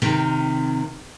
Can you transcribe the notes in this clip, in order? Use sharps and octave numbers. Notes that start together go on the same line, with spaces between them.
C3 D#3 C4